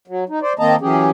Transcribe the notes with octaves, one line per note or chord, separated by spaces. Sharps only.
F#3
D#4
C5 D5
D#3 A#3 C4 D#5 A5 A#5
E3 F#3 C#4 G4 G#4